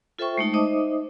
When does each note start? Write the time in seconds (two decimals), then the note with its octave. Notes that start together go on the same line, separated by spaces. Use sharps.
0.19 F4 A4 C5 E5 G5 C#6
0.38 G#3 A3 D#4 A5
0.54 D#4 C5 D#5 E5 D6 D#6